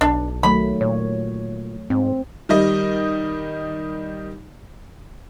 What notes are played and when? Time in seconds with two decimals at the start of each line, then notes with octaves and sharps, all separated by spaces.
0.01 B1 D4
0.43 D#3 F#3 A3 B5
0.81 A#2 C#5
1.90 G#2 C4
2.49 D#3 G3 D#5